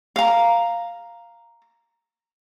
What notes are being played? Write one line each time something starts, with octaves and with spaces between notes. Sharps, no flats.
F5 A#5